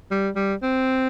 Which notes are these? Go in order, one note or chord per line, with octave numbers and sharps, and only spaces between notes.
G3
G3
C4